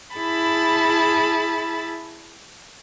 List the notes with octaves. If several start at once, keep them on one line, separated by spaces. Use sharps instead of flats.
E4 G#4 A5 B5